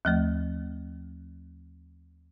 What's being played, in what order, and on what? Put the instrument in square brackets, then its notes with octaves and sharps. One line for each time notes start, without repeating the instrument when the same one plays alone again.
[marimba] D#2 F3 A3